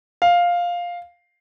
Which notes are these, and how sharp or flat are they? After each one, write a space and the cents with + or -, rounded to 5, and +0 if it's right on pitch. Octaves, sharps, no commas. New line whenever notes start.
F5 +5